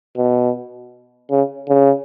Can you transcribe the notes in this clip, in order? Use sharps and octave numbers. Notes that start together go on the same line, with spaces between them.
B2
C#3
C#3